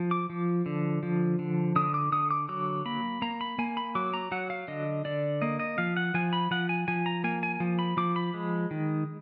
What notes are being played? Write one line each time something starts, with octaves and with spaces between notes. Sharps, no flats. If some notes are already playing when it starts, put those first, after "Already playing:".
Already playing: F3
D6
F3
D3
F3
D3
D3 D#6
D6
D3 D#6
D6
F#3 D6
A#3 B5
A#3 A#5
B5
A#3 G#5
B5
F#3 D6
A#5
F#3 F#5
F5
D3 D#5
D3 D5
A#3 D#5
D#5
F3 F5
F#5
F3 G#5
B5
F3 F#5
G#5
F3 G#5
A#5
A#3 G#5
G#5
F3
B5
F3 D6
B5
G#3
D#3